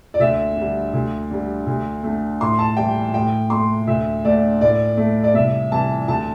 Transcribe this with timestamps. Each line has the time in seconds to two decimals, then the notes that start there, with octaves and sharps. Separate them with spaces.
0.14 D5
0.19 D2 E5
0.56 D3 G3
0.93 D2
1.31 D3 G3
1.67 D2
2.03 D3 A3
2.41 A2 C6
2.59 A5
2.77 E3 G3 G5
3.14 A2 G5
3.50 A3 C6
3.87 D2 E5
4.25 D3 A3 D5
4.61 A2 D5
4.97 A3
5.24 D5
5.34 C2 E5
5.71 C3 E3 G3 A5
6.08 D2 A5